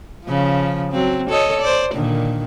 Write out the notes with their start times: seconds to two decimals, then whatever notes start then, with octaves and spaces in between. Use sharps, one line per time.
0.25 C#3 F3
0.92 F#3 C4
1.30 A4 C#5 D#5
1.61 C5 D5
1.94 A#2 D3 D#3